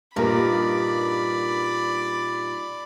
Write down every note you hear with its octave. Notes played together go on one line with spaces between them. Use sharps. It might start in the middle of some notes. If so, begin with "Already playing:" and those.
G2 A#2 G#3 D#4 A#4 D5 B5